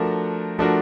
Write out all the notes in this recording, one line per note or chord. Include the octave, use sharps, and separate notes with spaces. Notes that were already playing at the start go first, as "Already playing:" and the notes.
Already playing: F3 A3 D4 F#4 A#4
F3 A3 D4 F#4 A#4